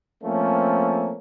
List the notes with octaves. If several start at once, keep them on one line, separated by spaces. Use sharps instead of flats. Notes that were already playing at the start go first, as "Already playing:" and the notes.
F3 A3 A#3 C4 C#4